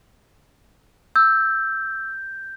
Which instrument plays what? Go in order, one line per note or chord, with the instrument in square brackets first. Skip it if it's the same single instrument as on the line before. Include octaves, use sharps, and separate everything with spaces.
[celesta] E6 [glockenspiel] G6